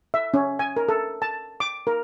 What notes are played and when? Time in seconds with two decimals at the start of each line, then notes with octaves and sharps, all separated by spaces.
0.14 E5
0.34 C#4
0.59 G#5
0.77 A#4
0.89 A4
1.22 A5
1.60 D6
1.87 A#4